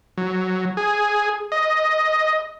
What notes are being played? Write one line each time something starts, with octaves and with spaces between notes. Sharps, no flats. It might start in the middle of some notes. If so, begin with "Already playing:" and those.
F#3
G#4
D#5